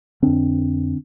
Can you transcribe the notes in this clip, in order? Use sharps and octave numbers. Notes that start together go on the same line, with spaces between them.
F2 D3 C4 D4